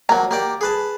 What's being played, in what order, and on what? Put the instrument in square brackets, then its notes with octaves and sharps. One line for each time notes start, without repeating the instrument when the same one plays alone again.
[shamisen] F3 A#5 [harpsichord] F#3 A#3
[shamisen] F#3 [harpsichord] A#3 G4 D5
[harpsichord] G#4 B4 A5